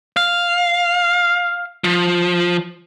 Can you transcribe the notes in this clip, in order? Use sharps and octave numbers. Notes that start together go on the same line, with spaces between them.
F5
F3